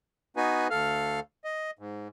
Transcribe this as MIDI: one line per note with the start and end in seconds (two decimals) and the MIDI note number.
0.37 0.68 59
0.37 0.68 63
0.37 0.68 66
0.37 0.68 71
0.37 0.68 80
0.70 1.20 38
0.70 1.20 69
0.70 1.20 77
0.70 1.20 89
1.44 1.71 75
1.79 2.08 44